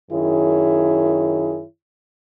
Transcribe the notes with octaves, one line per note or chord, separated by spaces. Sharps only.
F#2 D#3 E4 G#4 C#5